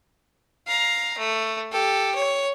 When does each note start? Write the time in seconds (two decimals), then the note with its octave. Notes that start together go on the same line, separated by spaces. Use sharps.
0.68 F5 A#5
1.18 A3
1.72 G4 A4
2.15 C#5